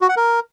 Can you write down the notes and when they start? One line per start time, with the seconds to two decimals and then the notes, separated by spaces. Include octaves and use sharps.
0.01 F#4
0.09 F#5
0.17 A#4